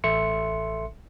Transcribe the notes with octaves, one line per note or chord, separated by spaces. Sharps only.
A1 A4 E5 C6 C#7